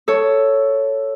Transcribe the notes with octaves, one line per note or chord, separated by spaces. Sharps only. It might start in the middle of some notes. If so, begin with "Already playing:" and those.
A4 C#5